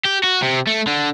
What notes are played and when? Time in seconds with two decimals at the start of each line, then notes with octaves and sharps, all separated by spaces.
0.05 G4
0.24 F#4
0.43 C3
0.67 A3
0.87 D3